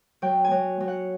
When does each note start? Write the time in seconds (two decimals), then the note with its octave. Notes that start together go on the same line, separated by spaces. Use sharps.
0.22 F#3 G5
0.45 G#5
0.51 F#3
0.80 F#3
0.88 F#5